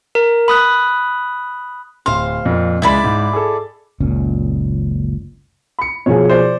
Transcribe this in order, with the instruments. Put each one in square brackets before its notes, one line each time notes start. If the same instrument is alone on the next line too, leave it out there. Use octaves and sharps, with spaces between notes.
[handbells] A#4
B5 D#6 F#6
[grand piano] D1 C6 [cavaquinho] C5 F5
[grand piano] F2 A#2
[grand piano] C#2 G#3 [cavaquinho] E4 D5 B5
[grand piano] G#2
G#4 A4
[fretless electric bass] F#1 C#2 A#2 C#4
[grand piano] B5 C#7
[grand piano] B2 F3 G#4 [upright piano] C#5 G#5
[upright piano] C5 D5